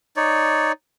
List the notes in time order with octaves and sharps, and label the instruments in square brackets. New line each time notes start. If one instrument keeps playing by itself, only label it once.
[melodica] D#4 C#5 D5